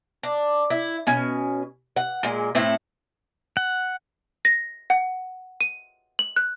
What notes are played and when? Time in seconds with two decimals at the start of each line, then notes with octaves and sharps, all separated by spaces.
0.23 D4
0.70 E4
1.07 B2 C#4 G#5
1.96 F#5
2.23 A#2 G#3
2.55 A2 A3 C4 E4
3.57 F#5
4.45 A#6
4.90 F#5
5.61 D#7
6.19 F#7
6.36 F#6